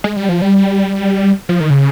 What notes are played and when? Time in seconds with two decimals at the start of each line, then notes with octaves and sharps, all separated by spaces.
0.04 G#3
0.16 G3
0.29 F3
0.42 G3
1.49 F3
1.60 D#3
1.70 C#3